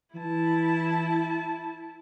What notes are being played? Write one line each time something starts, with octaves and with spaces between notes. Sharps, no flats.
E3 E4 A5